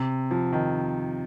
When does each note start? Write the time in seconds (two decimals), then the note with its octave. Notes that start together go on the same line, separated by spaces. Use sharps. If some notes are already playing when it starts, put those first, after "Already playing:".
Already playing: C3
0.31 F3
0.53 D#3